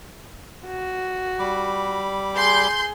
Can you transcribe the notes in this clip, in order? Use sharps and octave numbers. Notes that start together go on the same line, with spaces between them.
F#4
G3 B5 D6
G#4 C6 G6